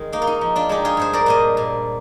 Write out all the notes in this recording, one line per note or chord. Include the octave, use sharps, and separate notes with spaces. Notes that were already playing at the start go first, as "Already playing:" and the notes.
Already playing: D#3 G#3
A#3 D#4
F4
D#4
F3
D4 F4
G#3 D#4 G4
F4 G#4
G2 G#4 C5
A#4 D5
A#2 C5 D#5
A#2